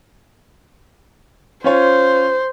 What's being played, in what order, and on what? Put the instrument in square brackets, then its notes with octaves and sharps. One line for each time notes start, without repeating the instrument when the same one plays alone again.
[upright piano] C#4 F4 C#5 [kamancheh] C5